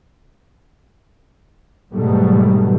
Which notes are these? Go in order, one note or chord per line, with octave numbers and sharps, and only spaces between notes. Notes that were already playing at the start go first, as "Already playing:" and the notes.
G#2 B2 D#3 F#3 G3 A3